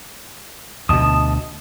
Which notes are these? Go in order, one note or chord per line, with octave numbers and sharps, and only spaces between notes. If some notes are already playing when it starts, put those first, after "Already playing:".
D2 B2 D#5 A5 D#6